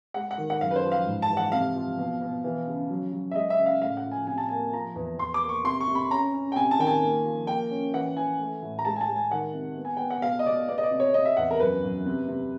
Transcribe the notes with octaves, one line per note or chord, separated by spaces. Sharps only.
G#3 F#5
F#5
D#3
F#5
F#2 F5
B4
C5
F3
F5
G#2
A5
E3
F#5
C3 F5
F3
B2
B2
E3
C#3
F#3
F#3
E5
G#3 D#5
E5
C#3
F5
A2 F5
F#5
F3
G#5
C3 G#5
A5
A#3 G#5
F3 A#5
E2
E2 C6
D6
A#3
C#6
C3 C6
C#6
C3
B5
C#4 A#5
C#4
G5
C3 G#5
A5
D#3 G5
G#5
A#3
F3
A#3 G5
C#4
E3 F#5
E3 G#5
A3
A2
A#5
G#3 A5
G#5
A5
G#3
G#5
D#3 F#5
C3
B3
G#5
B3 G5
F#5
B2 F5
D#5
B2 D5
B3 D5
D#5
D5
C3
C#5
C3 D#5
E5
E2 F#5
A#4
F#2 B4
F#2
C3
C3